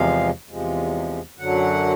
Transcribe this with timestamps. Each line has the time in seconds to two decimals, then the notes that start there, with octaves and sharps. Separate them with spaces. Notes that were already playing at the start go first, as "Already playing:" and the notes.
Already playing: E2 C3 F3 G#3 F5
0.49 E2 C3 F3 G#3
1.38 F#2 D3 F#3 F#5